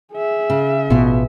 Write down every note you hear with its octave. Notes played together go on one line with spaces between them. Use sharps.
G#4 E5
C#3
A1 B2 B3 F4